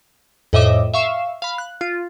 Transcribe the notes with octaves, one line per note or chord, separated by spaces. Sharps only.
F2 A2 D#5 E5 D6 E7
E5 F5 C#6 C7 E7
F5 B5
F#6
F4